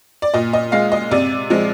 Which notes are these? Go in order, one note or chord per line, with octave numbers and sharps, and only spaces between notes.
D5
A#2 D#5
D#5
G#3 F5
D#5
C3 D5
F3 G#3